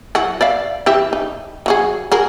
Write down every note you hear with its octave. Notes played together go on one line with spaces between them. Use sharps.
F#3 E4 F#4
D5 E5 F5
E3 G4 E5
D#4
F#3 F#4 G#4
F#4 G#4 A#4